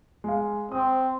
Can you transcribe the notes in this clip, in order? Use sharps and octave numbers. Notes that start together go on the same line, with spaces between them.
G#3 F5
C4 D#6